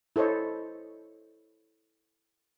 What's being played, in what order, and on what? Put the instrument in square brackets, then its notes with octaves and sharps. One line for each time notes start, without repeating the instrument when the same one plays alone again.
[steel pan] E4 A4 C5 C#5 D#5